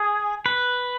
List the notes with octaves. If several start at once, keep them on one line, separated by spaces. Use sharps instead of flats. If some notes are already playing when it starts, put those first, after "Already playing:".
Already playing: G#4
B4